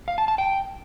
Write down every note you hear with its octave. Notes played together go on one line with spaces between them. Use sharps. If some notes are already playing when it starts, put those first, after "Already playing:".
F5
A5
A5
G5